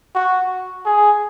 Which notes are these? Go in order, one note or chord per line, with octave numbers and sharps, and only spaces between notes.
F#4
G#4